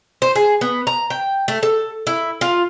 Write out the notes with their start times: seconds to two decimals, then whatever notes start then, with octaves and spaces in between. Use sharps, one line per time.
0.22 C5
0.36 G#4
0.61 B3
0.87 A#5
1.10 G5
1.48 A3
1.63 A4
2.07 E4
2.41 F4